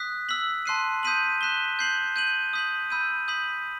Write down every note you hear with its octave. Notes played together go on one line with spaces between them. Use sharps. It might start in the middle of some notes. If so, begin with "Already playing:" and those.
Already playing: D#6 F#6 B6
E6 B6 F#7
A5 C6 F#6 C7 D#7
D#6 G6 B6 D#7 F#7
F#6 B6 E7 G7
G6 C7 F#7
G6 D#7 F#7
D#6 G6 B6 F#7
B5 E6 G6 D#7
D#6 G6 B6 F#7